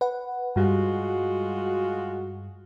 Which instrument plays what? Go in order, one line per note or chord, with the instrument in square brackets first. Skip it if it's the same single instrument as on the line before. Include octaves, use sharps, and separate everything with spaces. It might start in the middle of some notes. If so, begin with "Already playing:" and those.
[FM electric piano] B4 F#5
[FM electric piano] G2 G3 [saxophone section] G#3 F4 F#4